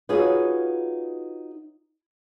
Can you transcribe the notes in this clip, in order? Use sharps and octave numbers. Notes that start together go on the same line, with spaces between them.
D#4 F4 F#4 G#4 B4 C#5